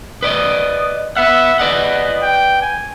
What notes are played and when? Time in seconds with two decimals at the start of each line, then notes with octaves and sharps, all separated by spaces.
0.23 B4 D5 D#5 D#6
1.17 B3 E5 F#5
1.59 B4 D5 D#5 F#5
2.22 G5
2.62 G#5